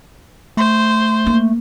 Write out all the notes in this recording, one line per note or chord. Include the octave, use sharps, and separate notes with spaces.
A3 C5
A#3